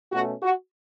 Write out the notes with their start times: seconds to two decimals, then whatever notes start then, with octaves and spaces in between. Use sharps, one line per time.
0.12 B2 A3 C#4 F#4
0.42 F#4